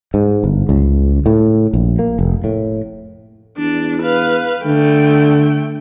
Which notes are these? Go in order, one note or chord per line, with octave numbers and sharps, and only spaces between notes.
G#2
G1
C#2
A2
A#1
A#3
F1
A2
E2 D4
B4 F5
D3 A3 G5